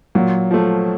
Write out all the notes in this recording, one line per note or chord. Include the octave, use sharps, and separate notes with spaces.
A#2 F#3
F3 A3